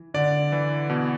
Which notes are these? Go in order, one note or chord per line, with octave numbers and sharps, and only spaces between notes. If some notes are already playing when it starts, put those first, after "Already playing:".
Already playing: E3
D3 D5
E3
B2